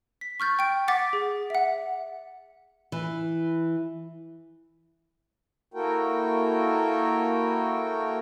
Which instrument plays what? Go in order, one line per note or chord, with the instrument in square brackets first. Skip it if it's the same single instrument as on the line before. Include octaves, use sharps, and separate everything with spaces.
[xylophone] B6
C#6 F6 G6 A6
G5 D7
F#5 D6 A6 B6
G#4
E5 F#5
[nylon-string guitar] E3
[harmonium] A#3 E4 F#4 A4 A#4 G5